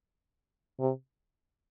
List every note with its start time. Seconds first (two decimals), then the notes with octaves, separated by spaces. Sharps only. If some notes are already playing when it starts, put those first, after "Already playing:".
0.80 C3